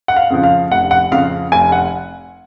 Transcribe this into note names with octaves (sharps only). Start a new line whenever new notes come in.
F#5
F5
F2 C#3 F3
F5
F1 F#5
F#5
F2 C#3 F3 F5
F1 G#5
F#5